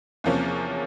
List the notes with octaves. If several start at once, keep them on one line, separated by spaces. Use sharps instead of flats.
E2 C3 F3 A#3 C#4